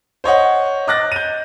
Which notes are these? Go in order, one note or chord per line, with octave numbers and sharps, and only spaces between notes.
C5 C#5 D#5 F#5
D#5 D6 F#6 A6 A#6
G6 D#7